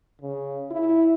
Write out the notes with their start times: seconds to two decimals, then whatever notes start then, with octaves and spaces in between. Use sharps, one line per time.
0.21 C#3
0.71 E4